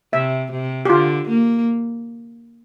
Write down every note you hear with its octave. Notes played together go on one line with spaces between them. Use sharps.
C3 E5
C3
G4
D3 F4
A#3